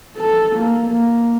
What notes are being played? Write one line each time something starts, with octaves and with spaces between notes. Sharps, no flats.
A4
A#3
A#3